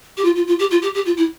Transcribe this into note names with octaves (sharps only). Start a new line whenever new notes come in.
G4
F4
F4
F4
G4
F4
G4
G4
F4
E4